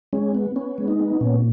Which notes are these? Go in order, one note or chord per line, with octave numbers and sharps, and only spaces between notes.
G#3 C#4
B3
B3 C#4
G#3
D#4
B3
A#2 C#4